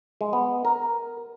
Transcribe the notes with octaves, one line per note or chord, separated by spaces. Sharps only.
G#3
B3
A#4